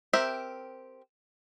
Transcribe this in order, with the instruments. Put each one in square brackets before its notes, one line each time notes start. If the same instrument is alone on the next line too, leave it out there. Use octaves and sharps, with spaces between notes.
[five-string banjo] C4 G4 A#4 E5